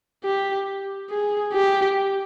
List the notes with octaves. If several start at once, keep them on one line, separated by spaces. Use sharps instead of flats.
G4
G#4
G4